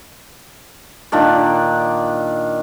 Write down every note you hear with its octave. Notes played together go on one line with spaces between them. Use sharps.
A#2 D#3 D4 D5